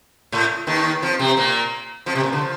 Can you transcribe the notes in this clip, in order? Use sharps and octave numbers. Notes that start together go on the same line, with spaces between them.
A2 A3
D#2 D#3
F2 F3
C3 C4
A#2 A#3
F2 F3
C3
A#2
D3
F3